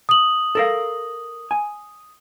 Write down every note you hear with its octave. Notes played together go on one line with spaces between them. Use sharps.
D#6 F#7
A4 A#4 F5
G#5